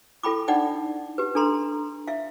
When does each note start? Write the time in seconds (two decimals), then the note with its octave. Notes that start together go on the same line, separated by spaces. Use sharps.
0.23 E4 A4 G5 B5 D6
0.48 D4 D#4 D5 F#5 G5
1.18 G4 B4
1.35 D4 A4 A#5 C6
2.08 E5 F5